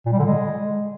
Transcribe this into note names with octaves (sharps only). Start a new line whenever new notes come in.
A#2
G3
D3
G#3